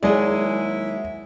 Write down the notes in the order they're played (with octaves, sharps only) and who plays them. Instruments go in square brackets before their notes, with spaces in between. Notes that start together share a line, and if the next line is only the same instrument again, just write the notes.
[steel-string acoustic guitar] D#2 F#3 G#4 [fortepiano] G#3 D5 [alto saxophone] E4